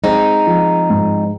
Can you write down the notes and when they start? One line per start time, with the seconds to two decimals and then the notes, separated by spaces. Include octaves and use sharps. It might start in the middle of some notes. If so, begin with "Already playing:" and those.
0.04 G#3 C4 D#4
0.47 F3
0.90 G#2